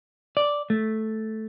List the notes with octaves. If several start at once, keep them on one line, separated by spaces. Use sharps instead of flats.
D5
A3